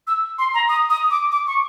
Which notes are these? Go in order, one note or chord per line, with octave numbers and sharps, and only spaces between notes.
E6
C6
A#5
D#6
D#6
D6
D6
C#6